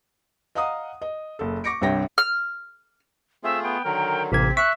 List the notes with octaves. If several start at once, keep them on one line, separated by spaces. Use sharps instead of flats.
D#5 F5 F#5 A#5 D#6
D#5
F#1 A4
C#6 D6 A#6 C#7 D7
C2 G2 C3 C#5 G5 A#6
F6
A3 C4 F4 G#4 E5
B3 G5
D3 D#3 F#3 A#4
A1 C3 A#3 C4 G#6 B6
E5 C#6 F#6 B6